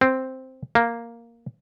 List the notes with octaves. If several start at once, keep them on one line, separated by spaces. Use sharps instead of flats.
C4
A#3